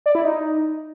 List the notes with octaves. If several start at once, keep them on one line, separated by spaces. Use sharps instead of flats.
D5
E4
D#4